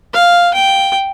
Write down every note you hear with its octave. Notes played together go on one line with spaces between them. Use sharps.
F5
G5